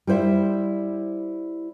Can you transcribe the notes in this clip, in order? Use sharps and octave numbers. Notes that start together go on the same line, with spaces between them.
G3 E4 C5 E5